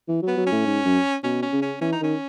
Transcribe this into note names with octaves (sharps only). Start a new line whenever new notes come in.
E3
F#3 B3
F#3
C#4
A2
G#2
F#2
B2 C#4
C#4
C#3
C#4
E3 C#4
D#4
D#3 C#4